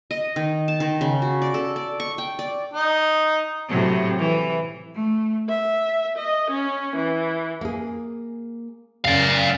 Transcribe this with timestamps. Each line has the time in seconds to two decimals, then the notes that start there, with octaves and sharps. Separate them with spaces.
0.11 D#5
0.36 D#3
0.68 A5
0.80 D#3
1.01 C#3
1.22 F#4
1.42 D5
1.54 A4
1.76 D5
2.00 C#6
2.18 G5
2.39 D5
2.73 D#4
3.68 A2 C3 F#3
4.18 E3
4.95 A3
5.49 E5
6.17 D#5
6.51 C#4
6.96 E3
7.61 A#3 G#4
9.05 F#2 C#3 D5 F5